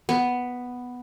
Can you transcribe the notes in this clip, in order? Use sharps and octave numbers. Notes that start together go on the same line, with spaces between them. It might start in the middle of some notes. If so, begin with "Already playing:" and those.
B3